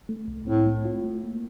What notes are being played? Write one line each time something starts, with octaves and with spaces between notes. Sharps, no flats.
A3
C2
A2 C4
A3
F4
A3
A#3